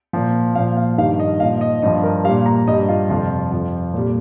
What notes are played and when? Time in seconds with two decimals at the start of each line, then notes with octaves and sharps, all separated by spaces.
0.13 A#2 F3
0.55 A#2 F3 F5
0.77 F5
0.98 G2 D#3 G3 F5
1.19 D#5
1.40 A#2 F3 F5
1.61 D#5
1.82 G2 F3 D#5
2.03 A#4
2.24 G3 F5
2.29 A#2
2.46 A#5
2.67 G2 D#5
2.71 G3
2.88 F4
3.09 F2 C3 F3 F4
3.52 F2 F3
3.94 A#2 G3